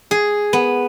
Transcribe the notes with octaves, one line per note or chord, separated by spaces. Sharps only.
G#4
B3